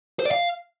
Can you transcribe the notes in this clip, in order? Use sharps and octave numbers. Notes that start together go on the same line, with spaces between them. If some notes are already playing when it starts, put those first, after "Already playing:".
C5
D5
F5